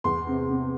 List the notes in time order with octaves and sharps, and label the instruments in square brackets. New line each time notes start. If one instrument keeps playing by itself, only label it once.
[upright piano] E2 C6
C3
C3